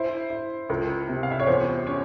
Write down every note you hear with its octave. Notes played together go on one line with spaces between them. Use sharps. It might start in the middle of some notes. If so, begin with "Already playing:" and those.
Already playing: E4 C5
E4
C#2 A#4
C3
F5
E5
C#5
E2 C5
C#4 C#5